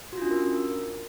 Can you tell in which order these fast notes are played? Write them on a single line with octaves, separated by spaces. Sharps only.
F#4 F4 D4 C#4 A#4